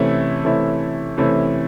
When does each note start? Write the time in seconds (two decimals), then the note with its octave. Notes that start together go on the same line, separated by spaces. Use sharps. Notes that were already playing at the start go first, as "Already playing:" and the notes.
Already playing: C3 E3 A3 C#4 E4
0.44 C3 E3 A3 C#4 E4
1.18 C3 E3 A3 C#4 E4